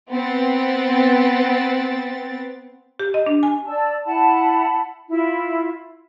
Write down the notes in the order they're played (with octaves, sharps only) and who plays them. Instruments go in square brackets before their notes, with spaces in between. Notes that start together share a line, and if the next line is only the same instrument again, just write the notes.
[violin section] B3 C4 A6
[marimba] G4
D#5
D4
G#5
[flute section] D5 A5 E6
E4 F#5 A5 B5
E4 F4